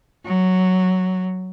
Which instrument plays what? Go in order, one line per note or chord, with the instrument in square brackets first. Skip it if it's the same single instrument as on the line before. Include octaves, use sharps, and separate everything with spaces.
[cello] F#3